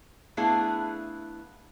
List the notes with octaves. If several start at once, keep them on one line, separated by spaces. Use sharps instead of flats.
A3 B3 D4 E4 G#4 F5